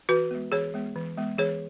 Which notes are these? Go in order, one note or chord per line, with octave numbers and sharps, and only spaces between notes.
E3 F#4 B4
G#3 B3
E3 G#4 C#5
G#3 B3
E3
G#3 B3
E3 G#4 C#5